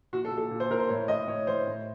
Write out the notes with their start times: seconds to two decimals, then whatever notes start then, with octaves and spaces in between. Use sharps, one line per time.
0.13 A#2 F#4
0.25 A4
0.31 A#2
0.38 A4
0.51 A#2
0.60 C5
0.70 A#2 A#4
0.80 C5
0.89 A2 C#5
1.08 A2 D#5
1.28 A2 C#5
1.47 A2 C5
1.67 A2